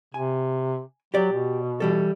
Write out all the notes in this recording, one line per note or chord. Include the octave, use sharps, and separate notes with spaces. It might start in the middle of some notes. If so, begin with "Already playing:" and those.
C3 G#5
F#3 G4 D5
B2
E3 G3 A4